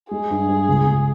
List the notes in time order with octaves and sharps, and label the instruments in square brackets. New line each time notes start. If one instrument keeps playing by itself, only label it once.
[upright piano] G#3 [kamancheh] G#4
[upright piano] G2
G2
C#2
C#2